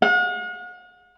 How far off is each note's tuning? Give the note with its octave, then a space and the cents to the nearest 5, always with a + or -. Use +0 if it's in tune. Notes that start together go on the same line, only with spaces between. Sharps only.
F#5 -45